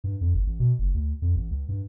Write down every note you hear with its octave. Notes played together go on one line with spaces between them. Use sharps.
G2
F2
G1
A1
B2
F#1
D2
F2
A1
C#2
G2